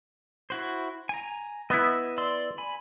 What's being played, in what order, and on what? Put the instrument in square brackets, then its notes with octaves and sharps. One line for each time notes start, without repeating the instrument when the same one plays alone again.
[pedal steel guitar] E4 F#4 C5
G#5 A#5
[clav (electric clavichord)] B3 E4 [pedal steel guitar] D#5 E5 B5
[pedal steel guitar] D5 C6 E6
G#5 B5